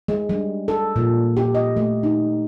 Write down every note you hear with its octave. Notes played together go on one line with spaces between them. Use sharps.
G#3
G3
A4
A#2
G4
D#5
A3
D#4